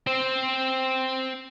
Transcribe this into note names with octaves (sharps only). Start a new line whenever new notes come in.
C4 C5